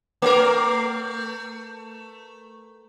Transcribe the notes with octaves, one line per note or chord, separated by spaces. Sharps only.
A3 A#4